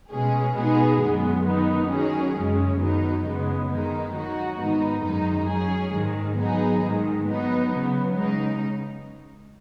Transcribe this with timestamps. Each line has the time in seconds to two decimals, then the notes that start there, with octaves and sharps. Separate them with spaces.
0.11 B2 G#3 C#4 G#4
0.57 B2 G#3 B3 D#4 G#4
1.01 F#2 D#3 G#3 B3
1.46 D#3 B3 D#4
1.90 D#3 F#3 C#4 G#4
2.35 F#2 C#3 G#3 C#4
2.80 D#3 F#3 B3 D#4
3.24 F#2 C#3 G#3 B3
3.69 D#3 G#3 D#4
4.14 F#3 D#4 F#4
4.58 G#2 D#3 B3 D#4
5.04 F#2 D#3 G#3 D#4
5.48 F#3 C#4 G#4
5.93 G#2 D#3 G#3
6.38 F#3 B3 D#4 G#4
6.82 G#2 D#3 G#3
7.27 F#3 B3 D#4
7.72 C#3 F#3 B3
8.17 C#3 G#3 D#4